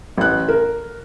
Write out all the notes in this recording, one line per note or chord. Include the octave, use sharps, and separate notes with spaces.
A1 F#6
A#4